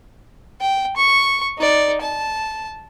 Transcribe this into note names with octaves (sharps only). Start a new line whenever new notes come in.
G5
C#6
D#4 D5
A5